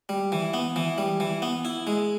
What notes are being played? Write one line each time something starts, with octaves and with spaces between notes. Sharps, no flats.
G3
E3
B3
E3
G3
E3
B3
E4
G#3